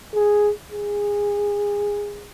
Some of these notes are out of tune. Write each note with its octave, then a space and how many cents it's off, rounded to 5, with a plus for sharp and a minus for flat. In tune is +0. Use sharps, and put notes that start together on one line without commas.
G#4 +0
G#4 -20